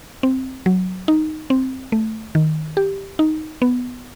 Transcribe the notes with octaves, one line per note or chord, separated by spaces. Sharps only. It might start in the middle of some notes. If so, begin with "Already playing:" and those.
C4
F#3
D#4
C4
A3
D#3
G4
D#4
B3